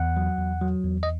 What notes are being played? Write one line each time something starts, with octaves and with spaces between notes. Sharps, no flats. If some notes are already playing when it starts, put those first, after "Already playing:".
Already playing: E2 F#5
F#3
E2
F#3
E2
D#5